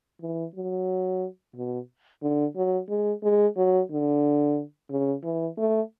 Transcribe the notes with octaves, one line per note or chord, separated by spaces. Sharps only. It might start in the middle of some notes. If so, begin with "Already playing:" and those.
E3
F#3
B2
D3
F#3
G#3
G#3
F#3
D3
C#3
E3
A3